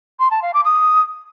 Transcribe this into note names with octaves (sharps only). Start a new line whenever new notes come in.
C6
A5
F5
D6
D#6